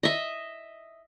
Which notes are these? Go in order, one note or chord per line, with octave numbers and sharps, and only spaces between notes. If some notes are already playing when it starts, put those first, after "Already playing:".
D#5 E5